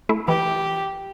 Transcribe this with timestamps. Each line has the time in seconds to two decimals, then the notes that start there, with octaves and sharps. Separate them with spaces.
0.09 A3 E4
0.28 E3 G4